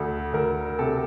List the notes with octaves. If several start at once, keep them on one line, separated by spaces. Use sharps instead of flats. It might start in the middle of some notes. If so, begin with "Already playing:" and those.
Already playing: D2 A4
D2 A#4
C3 A4